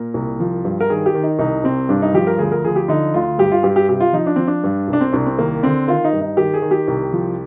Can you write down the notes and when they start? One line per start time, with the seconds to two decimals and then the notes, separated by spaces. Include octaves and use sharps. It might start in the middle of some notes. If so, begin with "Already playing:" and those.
Already playing: A#2 A#4
0.14 C2
0.40 F3
0.65 G2
0.81 A#4
0.90 D#3 G#4
1.06 G4
1.14 D#3
1.23 D#4
1.39 C2 D#4
1.64 C2 C4
1.89 G2 D4
2.02 D#4
2.14 F3 G4
2.27 A#4
2.38 D2 G#4
2.52 A#4
2.65 F3 G#4
2.76 G4
2.88 D3 D#4
3.14 D2 F4
3.38 G2 G4
3.52 F4
3.63 G2 G4
3.76 G4
3.88 C3 G4
4.01 F4
4.13 F3 D#4
4.26 D4
4.36 F3 C4
4.47 D4
4.64 G2
4.88 C2
4.93 D4
5.01 C4
5.12 C2 D4
5.26 C4
5.39 D#2 A#3
5.63 D3 C4
5.88 D#3 F4
6.04 D#4
6.13 G2
6.21 D#4
6.37 D#3 G4
6.54 G#4
6.62 D#3
6.71 G4
6.88 C2
7.12 F3